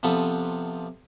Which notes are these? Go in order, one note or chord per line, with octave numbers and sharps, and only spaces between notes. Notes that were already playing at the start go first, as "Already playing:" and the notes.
C3 F3 B3 A4 B4 D#6